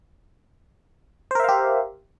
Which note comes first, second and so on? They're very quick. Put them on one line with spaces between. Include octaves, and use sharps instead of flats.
C5 A#4 E5 F5 G4